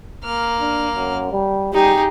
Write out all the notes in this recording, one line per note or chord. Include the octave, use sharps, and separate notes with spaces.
A#3 F6
D4
F#2
G3
G3 D#4 G4 G#4